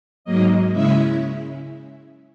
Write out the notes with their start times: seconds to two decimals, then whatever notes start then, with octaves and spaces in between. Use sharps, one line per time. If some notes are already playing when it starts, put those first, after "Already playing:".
0.25 G#2 F#3 A#3 D#5
0.73 C#3 G#3 C#4 E4 E5